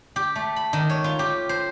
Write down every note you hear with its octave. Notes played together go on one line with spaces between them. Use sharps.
G4
A3
B5
D#3
C#5
F4
G4
C5